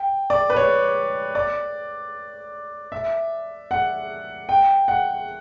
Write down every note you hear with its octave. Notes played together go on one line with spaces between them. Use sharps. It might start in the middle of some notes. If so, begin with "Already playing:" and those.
Already playing: G5
D5
B4
C#5
D5
E5
F#5
G5
F#5